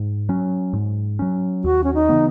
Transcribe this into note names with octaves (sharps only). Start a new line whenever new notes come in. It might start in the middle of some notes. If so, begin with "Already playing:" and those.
Already playing: G#2
F#3 C#4
G#2
F#3 C#4
D#2 F#4
C#4
D#4
C#3 E3 B3